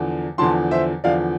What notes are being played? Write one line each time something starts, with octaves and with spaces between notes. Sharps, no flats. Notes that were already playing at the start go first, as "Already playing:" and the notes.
Already playing: E2 D3 F3
E2 D3 F3 A5 C6
C5 E5
E2 D3 F3 D5 F5